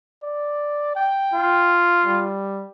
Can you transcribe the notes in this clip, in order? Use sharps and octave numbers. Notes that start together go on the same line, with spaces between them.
D5
G5
F4
G3